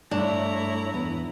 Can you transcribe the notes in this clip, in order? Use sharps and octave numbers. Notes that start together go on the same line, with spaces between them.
G2 A3 D4 E4 C#5 A#5
E2 B3